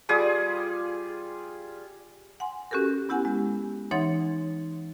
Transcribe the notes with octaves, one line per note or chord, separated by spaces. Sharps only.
G3 F4 G#4 D#6
F#5 G#5 C6
C#4 F#4 G4 A4 A#4
B3 E4 G4 F#5 G#5
G#3
E3 D#4 C#5 F#5 C6 A6